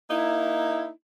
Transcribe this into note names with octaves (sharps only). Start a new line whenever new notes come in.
A#3 D#4 E4